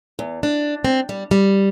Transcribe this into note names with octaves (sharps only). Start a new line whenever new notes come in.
E2
D4
C4
G3
G3